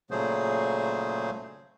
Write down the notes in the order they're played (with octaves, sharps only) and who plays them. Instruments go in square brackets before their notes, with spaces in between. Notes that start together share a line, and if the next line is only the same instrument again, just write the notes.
[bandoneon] A#2 C#3 F#3 A3 G#4 C5